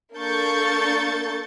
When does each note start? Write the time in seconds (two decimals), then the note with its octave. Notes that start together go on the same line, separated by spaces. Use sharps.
0.15 A#3 D4 A4 C#6 G6 A6